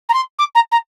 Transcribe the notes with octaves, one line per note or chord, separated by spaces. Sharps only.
A#5
C6
D6
A#5
A#5